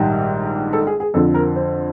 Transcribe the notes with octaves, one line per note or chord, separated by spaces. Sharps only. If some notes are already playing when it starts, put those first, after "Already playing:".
Already playing: A#1 G#2 D#3 G3
A4
G#4
G#4
F2 D3 F3 A4
A#4
C5